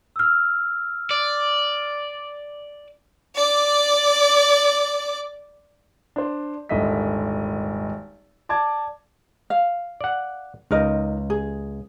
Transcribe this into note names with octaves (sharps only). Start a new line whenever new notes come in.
E6 F6
D5
D5 D6
D4 C5
D#1 G#1 D3 D#5 E5 B6
D5 A5 D6 G#6
F5
D5 F#5
C#2 D#4 A#4 D#5
G#4